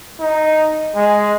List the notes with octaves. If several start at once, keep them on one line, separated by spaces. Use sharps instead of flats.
D#4
G#3